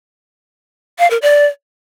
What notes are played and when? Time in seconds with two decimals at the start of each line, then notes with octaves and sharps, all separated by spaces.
0.99 F5
1.10 A#4
1.22 D5